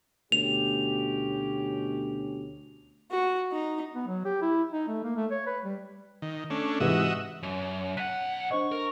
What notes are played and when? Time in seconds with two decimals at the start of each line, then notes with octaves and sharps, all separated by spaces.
0.32 D2 B2 C#4 G4 F7
3.11 F#4
3.52 D#4
3.95 B3
4.07 F#3
4.25 G4
4.42 E4
4.72 D#4
4.88 A3
5.03 A#3
5.16 A3
5.31 C#5
5.46 B4
5.64 G3
6.22 D#3
6.50 A3 C#4 D4
6.80 G#2 C3 E3 F#4 D#5 E5
7.43 F#2
7.97 B1 F#5 F#6 B6 D#7
8.51 D4 C5 D#5 C#6
8.72 A#4